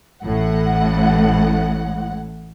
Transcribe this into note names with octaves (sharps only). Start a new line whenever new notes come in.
A1 A2 F#5